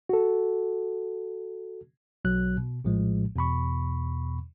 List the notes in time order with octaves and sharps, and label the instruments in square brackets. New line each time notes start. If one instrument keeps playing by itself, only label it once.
[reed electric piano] F#4 A4
[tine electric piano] B1 F#3 F#6
B2
A#1 A2 F3 G#3
E2 B2 B5 C#6